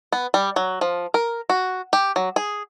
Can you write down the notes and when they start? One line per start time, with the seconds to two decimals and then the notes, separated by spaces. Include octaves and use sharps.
0.12 B3
0.34 G3
0.56 F#3
0.81 F3
1.14 A#4
1.50 F#4
1.93 G4
2.16 F#3
2.36 G#4